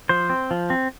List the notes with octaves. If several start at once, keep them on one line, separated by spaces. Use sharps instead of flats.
F3 C5
C4
F3
C4